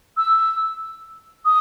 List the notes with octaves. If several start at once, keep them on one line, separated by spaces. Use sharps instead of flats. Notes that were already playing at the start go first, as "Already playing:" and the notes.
E6
D#6